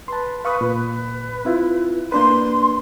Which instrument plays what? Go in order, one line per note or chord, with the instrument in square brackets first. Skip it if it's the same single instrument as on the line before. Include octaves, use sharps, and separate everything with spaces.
[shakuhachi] B4 [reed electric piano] A5 C6
[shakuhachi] B4 [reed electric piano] F5 C#6 D#6
[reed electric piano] A#2 [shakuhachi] B4
[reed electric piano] C4 E4 F4
[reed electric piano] A#3 D4 B4 [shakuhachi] C6